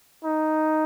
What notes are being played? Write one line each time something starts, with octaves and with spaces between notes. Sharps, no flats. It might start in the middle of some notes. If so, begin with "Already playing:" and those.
D#4